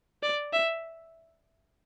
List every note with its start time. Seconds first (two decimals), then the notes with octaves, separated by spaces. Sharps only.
0.23 D5
0.53 E5